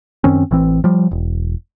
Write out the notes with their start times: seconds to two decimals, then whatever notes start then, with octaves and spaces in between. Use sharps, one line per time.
0.24 F#2 D#3 C4 C#4
0.51 A1 E3 C4
0.84 F3 G3
1.11 E1